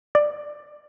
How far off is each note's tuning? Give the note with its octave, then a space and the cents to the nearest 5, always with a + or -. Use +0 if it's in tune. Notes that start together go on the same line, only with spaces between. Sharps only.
D5 +15